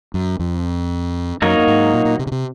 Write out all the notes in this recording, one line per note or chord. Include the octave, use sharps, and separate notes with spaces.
F#2
F2
F#2 F#3 A#3 D#4 A#4 C#5
F#2
G#2
A#2
A#2
C3
C#3
C3